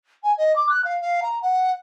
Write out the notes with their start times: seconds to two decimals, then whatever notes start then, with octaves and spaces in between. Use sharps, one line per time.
0.23 G#5
0.37 D#5
0.55 D6
0.69 F#6
0.84 F5
1.01 F5
1.22 A#5
1.42 F#5